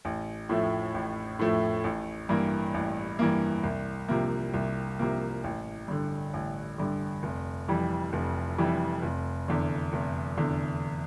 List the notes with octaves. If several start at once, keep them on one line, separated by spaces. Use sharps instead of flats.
A1
A2 F3 A3 E4
A1
A2 F3 A3 E4
A1
G2 E3 A#3
A1
G2 E3 A#3
C2
C3 F3 A#3
C2
C3 F3 A#3
A1
G2 D3
A1
G2 D3
F1
F2 E3 G3
F1
F2 E3 G3
F1
E2 D3
F1
E2 D3